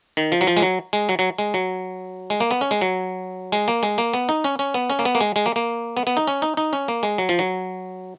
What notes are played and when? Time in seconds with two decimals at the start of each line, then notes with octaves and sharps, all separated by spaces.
0.17 D#3
0.32 F3
0.41 F#3
0.47 F3
0.57 G#3
0.62 F#3
0.93 G#3
1.09 F#3
1.19 F#3
1.38 G#3
1.54 F#3
2.30 G#3
2.40 A#3
2.51 B3
2.61 C#4
2.71 G#3
2.81 F#3
3.52 G#3
3.68 A#3
3.83 G#3
3.98 A#3
4.14 B3
4.29 D#4
4.44 C#4
4.59 C#4
4.74 B3
4.90 C#4
4.99 A#3
5.05 B3
5.15 A#3
5.21 G#3
5.36 G#3
5.46 A#3
5.56 A#3
5.97 B3
6.07 B3
6.17 D#4
6.28 C#4
6.42 D#4
6.57 D#4
6.73 C#4
6.88 A#3
7.03 G#3
7.18 F#3
7.29 F3
7.39 F#3